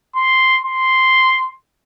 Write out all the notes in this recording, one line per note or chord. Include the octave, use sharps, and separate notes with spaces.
C6
C6